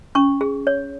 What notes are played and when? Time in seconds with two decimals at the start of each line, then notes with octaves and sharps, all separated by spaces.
0.15 C#4 C#6
0.41 G#4
0.67 C#5